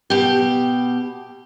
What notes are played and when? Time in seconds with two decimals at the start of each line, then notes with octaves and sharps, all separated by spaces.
0.10 B2 G4